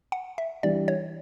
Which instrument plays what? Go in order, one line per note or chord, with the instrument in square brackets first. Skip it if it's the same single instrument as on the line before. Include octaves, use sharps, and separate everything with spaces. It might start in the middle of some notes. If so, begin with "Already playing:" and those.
[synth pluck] F#5
E5
[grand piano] E3 G3 D4 [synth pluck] D5
[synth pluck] C#5